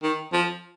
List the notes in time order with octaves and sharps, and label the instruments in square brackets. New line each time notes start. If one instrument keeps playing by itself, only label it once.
[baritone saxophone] D#3
F3